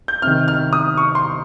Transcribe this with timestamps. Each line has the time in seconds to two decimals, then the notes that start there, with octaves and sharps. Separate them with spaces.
0.08 G6
0.22 C3 D#3 F6
0.48 F6
0.73 D#6
0.97 C#6
1.15 C6